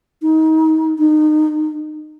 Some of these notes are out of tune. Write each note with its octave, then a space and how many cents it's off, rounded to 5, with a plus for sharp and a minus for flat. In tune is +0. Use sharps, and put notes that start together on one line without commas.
D#4 +30
D#4 -25